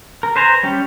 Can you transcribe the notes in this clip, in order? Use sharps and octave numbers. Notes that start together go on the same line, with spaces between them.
A#4
B4 C5 G#5 A#5
G3 C#4 G4